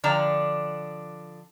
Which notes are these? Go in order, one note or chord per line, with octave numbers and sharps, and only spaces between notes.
D3 F3 D4 G5 A#5